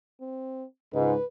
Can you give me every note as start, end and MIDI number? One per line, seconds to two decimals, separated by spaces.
0.20 0.65 60
0.94 1.15 37
0.94 1.15 44
0.94 1.25 71